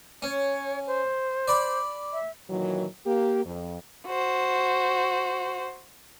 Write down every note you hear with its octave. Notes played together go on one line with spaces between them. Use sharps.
C#4 C#5
C5
D5 B5
E5
A#2 D#3 E3 F#3
A#3 G4
F2
F#4 C5